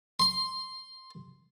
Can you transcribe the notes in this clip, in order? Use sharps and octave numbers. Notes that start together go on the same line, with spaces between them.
C6